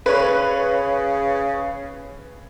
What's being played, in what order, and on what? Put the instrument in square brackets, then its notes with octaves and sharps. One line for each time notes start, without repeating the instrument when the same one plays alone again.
[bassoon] C#3 [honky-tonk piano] B4 C#5